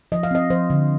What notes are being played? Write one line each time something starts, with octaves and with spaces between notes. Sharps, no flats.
F3 D#5
F5
C4 D#5
F3 C5
D3